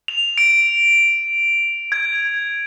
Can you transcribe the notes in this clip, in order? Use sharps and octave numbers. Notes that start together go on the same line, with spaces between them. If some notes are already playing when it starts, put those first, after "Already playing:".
F7
D7
G#6